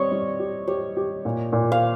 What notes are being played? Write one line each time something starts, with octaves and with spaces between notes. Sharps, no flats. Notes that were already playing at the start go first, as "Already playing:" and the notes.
Already playing: G3 C4 C#5 D#5
G3
G4
G4 C#5
G4
A#2
A#2
F5